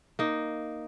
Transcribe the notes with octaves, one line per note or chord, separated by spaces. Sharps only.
A#3 D#4